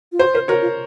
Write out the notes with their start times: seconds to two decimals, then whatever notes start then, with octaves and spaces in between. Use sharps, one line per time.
0.12 F4
0.19 F#4 C5
0.34 A#4 C5
0.48 F#4 A#4 C#5
0.62 F4